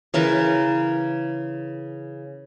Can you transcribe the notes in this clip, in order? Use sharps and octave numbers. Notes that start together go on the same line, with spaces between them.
C#3 E3 A#4 B4